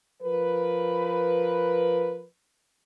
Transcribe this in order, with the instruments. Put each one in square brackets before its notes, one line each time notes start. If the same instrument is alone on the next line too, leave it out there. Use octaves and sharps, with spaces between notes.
[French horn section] F3 A#4 B4